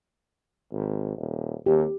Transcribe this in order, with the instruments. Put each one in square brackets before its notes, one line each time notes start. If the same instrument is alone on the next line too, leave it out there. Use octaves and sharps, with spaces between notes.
[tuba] G#1
D#1
[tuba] D#2 [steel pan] G4